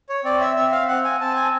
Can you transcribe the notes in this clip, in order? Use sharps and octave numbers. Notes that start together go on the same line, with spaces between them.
C#5
C4 D5
E5
C4 E5
F5
C4 F#5
G#5
C4 A5
G#5